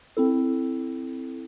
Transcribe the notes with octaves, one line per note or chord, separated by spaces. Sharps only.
C4 E4 A4